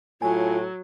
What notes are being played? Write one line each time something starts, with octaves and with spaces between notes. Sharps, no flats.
A2 F#3 F4 G#5